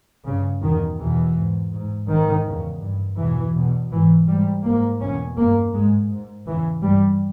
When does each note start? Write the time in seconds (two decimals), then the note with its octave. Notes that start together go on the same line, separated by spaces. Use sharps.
0.25 G2 C#3
0.61 E2 B2 D#3
0.98 E2 B2 E3
1.35 G#2
1.71 G#2
2.07 G#2 D#3
2.45 E2 C#3
2.81 G2
3.18 E2 B2 E3
3.54 E2 B2
3.91 G#2 E3
4.27 G#2 G3
4.63 G#2 A#3
5.00 E2 B2 C#4
5.37 G2 A#3
5.73 G#2 G#3
6.09 G#2
6.45 E2 C#3 E3
6.82 G2 G3